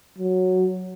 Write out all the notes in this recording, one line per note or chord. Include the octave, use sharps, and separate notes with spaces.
F#3